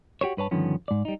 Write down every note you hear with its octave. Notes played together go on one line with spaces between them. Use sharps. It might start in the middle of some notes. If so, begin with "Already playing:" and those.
F#4 G4 C5 C#5
G2 B4 C#5 A5
G2 D3 D#3 F3 B3 C#4
G#2 D5
G3 D#4